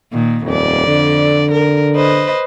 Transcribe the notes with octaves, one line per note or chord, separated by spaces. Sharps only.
A#2 D#3
D#1 F2 D5
D3
A#4
B4 C5 D#5